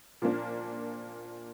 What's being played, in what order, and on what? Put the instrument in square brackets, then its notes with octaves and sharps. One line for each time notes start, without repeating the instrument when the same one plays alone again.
[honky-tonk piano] A#2 F3 A#3 D4